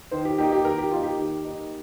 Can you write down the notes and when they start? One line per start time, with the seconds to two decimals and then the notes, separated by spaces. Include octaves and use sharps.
0.11 D#3 C5
0.25 G4
0.38 A#3 D#4 G4
0.52 G4
0.65 D#3 A#4
0.78 G4
0.91 A#3 D#4 F4
1.03 G4
1.18 D#3 G4
1.45 A#3 D#4